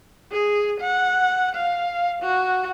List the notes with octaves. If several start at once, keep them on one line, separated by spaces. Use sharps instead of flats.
G#4
F#5
F5
F#4